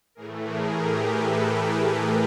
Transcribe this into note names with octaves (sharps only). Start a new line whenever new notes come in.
A2 E3 A3 G#4 A#4
G#4 A#4
G4
A4 B4